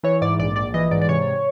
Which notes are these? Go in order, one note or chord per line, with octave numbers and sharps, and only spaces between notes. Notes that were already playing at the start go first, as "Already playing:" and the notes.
E3 C#5
G#2 D5
A#1 D5
A#1 D5
E3 D#5
G#2 D5
D5
C3 C#5